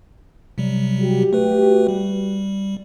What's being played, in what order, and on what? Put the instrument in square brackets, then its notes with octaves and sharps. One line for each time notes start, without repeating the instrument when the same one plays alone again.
[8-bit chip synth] C3 F#3 G3
[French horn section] F#4 G4
[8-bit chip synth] A3 B4
G3